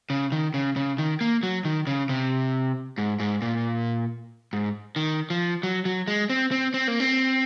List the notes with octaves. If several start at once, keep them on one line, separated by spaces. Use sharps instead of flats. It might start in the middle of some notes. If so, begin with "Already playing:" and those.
C#3
D#3
C#3
C#3
D#3
A#3
F#3
D#3
C#3
C3
G#2
G#2
A#2
G#2
D#3
F3
F#3
F#3
G#3
C4
C4
C4
A#3
C4